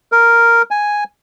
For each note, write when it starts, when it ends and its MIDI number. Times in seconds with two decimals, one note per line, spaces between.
0.12 0.62 70
0.71 1.04 80